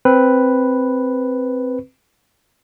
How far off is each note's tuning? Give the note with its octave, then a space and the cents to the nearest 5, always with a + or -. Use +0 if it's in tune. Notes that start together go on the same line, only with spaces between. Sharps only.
C4 +0 B4 +0